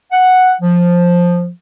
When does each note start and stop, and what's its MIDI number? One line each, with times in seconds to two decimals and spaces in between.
0.12 0.52 78
0.61 1.49 53